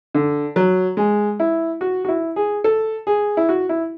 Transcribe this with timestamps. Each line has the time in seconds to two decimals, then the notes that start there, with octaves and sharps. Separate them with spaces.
0.15 D3
0.56 F#3
0.97 G#3
1.40 E4
1.81 F#4
2.05 F#4
2.08 E4
2.36 G#4
2.64 A4
3.07 G#4
3.37 E4
3.49 F#4
3.69 E4